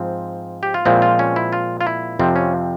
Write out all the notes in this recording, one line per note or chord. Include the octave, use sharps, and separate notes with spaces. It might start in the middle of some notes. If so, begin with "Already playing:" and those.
Already playing: G#2 F3 C4
G4
F4
A#2 F3 G#3 C4 E4
F4
C#4
E4
F4
F4
E4
F2 C3 F3 C4
C#4